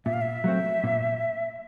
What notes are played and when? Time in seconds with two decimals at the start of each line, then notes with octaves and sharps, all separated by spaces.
0.06 A#2 E5
0.13 F5
0.21 E5
0.44 F#3 A3 C4
0.84 A#2